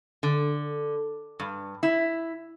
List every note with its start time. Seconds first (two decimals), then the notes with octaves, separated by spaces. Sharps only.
0.23 D3
1.40 G2
1.83 E4